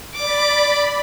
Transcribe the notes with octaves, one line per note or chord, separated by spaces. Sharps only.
D5 B5 D6